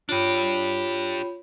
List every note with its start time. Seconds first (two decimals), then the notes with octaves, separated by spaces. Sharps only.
0.09 D4 F4 G4 C#5 B5